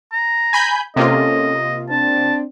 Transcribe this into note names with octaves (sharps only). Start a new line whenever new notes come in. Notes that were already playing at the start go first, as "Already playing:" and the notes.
A#5
G#5 B5 G6
C3 A#3 C#4 F4 A4 D#5
C4 D4 A5